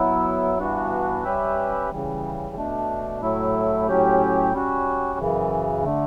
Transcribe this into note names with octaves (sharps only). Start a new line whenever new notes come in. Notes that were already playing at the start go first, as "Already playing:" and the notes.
Already playing: F#3 B3 E4
G2 E3 B3 D4 F#4
G3 C#4 G4 B4 E5
C#3 E3 G3
B2 A3 D4
A2 F#3 A3 E4
A2 F#3 C#4 G4
G3 C#4 F#4
F#2 C#3 E3
D3 A3